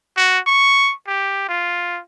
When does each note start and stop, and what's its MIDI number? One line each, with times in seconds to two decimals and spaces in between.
0.17 0.39 66
0.47 0.93 85
1.08 1.44 67
1.49 2.00 65